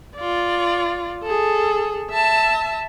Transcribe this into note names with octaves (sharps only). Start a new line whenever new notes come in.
F4 D5
G#4 A4
E5 A5